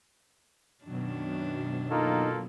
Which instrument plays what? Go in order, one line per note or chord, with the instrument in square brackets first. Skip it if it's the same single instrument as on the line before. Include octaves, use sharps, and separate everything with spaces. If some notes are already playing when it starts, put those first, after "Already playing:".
[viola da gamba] F#2 D#3 D4 [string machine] B2 F#3
[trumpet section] A#3 F4 A4 [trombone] D#4